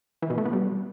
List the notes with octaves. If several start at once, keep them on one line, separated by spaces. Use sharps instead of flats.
E3
B2
A3
B3
G3